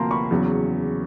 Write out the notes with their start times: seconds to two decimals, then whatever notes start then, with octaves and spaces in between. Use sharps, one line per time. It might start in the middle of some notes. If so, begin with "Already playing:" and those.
Already playing: D2 C3 F3 A#3 A5 A#5 C6
0.11 B5 C#6
0.31 E2 C#3 F#3